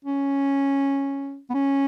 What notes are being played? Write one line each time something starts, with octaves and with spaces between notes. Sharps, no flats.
C#4
B3
C#4